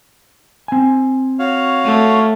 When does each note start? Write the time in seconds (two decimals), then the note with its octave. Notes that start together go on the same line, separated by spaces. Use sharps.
0.68 C4 G#5
1.39 F#4 C#5 F5
1.85 A3